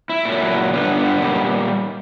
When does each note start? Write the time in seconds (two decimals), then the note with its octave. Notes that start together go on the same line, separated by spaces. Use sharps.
0.09 E4
0.25 A#2 F#3
0.73 G2 D3 G3 B3
0.97 B3
1.21 A#2 G3